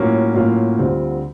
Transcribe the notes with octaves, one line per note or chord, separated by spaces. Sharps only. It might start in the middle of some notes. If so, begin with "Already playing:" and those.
Already playing: A2 F#3 A#3 C#4 F4
A2 F#3 A#3 C#4 F4
D2 D3 G3 C4 F4